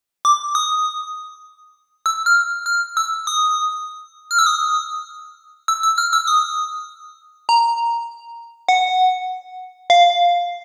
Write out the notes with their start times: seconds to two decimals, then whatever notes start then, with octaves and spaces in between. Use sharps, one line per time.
0.25 D6
0.55 D#6
2.06 E6
2.26 F6
2.66 F6
2.97 E6
3.27 D#6
4.31 F6
4.39 E6
4.46 D#6
5.68 E6
5.83 E6
5.98 F6
6.13 E6
6.27 D#6
7.49 A#5
8.69 F#5
9.90 F5